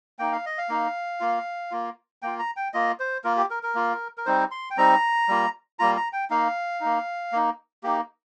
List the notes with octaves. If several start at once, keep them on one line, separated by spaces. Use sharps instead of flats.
A#3 D#4 G5
F5
D#5
F5
A#3 D#4
A#3 F4
A#3 F4
A#3 F4 G5
A#5
G5
A#3 F4 D#5
C5
A#3 F4 A#4
G4
A#4
A#4
A#3 F4
A#4
G3 C4 D#4 C5
C6
G5
G3 C4 D#4 A#5
G3 A#3 F4
G3 A#3 F4 A#5
A#5
G5
A#3 D#4 F5
A#3 D#4
A#3 D#4
A#3 D#4 G4